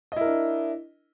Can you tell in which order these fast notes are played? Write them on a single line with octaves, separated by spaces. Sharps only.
D#5 E4 A#4 D4